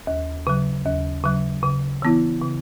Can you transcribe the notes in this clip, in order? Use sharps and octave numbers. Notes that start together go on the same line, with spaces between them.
D#2
C#3 F#3
D#2
C#3 F#3
C#3
E3 B3 E4
C#3